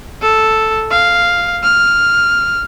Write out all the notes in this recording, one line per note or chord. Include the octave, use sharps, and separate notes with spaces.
A4
F5
F6